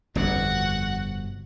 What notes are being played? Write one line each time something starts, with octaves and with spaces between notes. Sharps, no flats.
G1 F2 C3 F#4 F#5